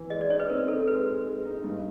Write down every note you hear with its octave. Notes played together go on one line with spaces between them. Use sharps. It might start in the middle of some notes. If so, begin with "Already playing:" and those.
Already playing: E3
G#3 D#5
D5
D#4 C#5
B4
C4 A#4
D#4 A4
G#3 B4
G#3
G#3
D#4
G2